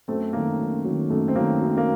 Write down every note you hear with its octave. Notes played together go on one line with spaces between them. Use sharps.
F#2 A3 C4
D#3 F#3 A#3
F#2
D#3 F#3
F#2 A3
C4
D#3 F#3 A#3
F#2
A#3